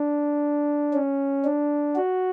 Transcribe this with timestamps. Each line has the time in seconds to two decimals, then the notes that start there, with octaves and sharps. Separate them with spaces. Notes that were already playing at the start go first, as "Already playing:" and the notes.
Already playing: D4
0.94 C#4
1.45 D4
1.96 F#4